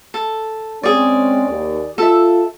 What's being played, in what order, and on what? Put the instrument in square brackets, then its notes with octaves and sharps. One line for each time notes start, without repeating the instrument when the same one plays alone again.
[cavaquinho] A4
[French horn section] G#3 C4 C#4 [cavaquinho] G#4 D5
[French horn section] D#2
[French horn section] F4 [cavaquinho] A4 E5